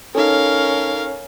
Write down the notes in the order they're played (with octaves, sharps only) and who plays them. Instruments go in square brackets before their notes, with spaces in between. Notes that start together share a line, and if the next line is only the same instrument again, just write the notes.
[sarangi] C#4 [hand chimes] D#4 A4 [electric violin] A#4 F5